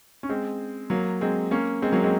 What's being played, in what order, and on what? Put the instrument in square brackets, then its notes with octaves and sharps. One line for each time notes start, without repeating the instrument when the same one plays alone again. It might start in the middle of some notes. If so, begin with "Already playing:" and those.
[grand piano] C#4
G#3 C4
F#3 A#3
G#3 C4
A#3 C#4
G#3 C4
F#3 A#3
G#3 C4